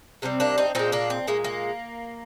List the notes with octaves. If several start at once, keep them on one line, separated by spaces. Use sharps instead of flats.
C3 D#3 G3 C4
A#3 D4
C4 D#4
A#2 G#3 C4 D#4
A#3 D4
C4
A#2 G#3 A#3
A#3